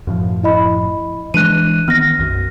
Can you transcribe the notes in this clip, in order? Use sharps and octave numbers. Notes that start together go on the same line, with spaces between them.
F#2 A2 F3
E4 D#5 B5
E3 G#3 D4 F#6 D#7
D#3 B3 F6 A#6
B1 F#2